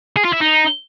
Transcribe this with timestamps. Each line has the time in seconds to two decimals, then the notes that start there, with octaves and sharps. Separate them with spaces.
0.16 G#4
0.25 F4
0.33 E4
0.41 D#4